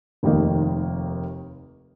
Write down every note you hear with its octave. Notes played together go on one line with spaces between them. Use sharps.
F1 D#2 D#3 A#3 D#4